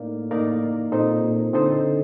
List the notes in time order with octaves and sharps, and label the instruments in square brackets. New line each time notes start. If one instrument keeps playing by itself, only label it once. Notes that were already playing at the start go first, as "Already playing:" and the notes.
Already playing: [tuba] A2 [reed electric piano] A#3 D#4 A#4 D5 F5
[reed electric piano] A#3 D#4 A#4 D5 F5
[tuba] A#2 [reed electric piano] C4 D#4 A4 C5 D#5
[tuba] A#2
[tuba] D3 [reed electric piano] C4 D#4 A4 C5 D#5